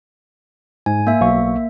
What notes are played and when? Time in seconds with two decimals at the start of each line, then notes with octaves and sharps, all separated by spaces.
0.86 G#2 G#5
1.07 A#3 E5
1.21 B1 F5 C#6